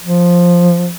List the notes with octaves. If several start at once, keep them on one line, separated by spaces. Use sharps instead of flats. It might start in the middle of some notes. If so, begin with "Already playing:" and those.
F3